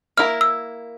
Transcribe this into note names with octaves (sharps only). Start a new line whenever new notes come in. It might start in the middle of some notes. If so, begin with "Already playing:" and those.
A#3 E4 A#4 F6
E6